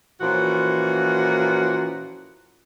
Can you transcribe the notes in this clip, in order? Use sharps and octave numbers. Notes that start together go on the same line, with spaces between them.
A#2 E3 F3 C#4 F#4